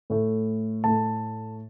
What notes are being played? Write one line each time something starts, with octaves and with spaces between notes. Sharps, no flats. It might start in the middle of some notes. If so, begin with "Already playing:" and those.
A2 A3
A2 A3 A5